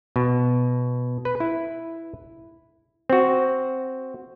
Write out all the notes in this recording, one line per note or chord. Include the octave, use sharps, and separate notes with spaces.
B2
B4
E4
C4 F#4